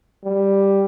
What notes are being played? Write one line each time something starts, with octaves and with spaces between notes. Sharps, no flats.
G3